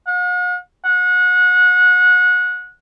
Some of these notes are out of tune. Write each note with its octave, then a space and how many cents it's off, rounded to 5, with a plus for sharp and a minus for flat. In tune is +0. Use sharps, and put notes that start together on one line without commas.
F#5 -45
F#5 -25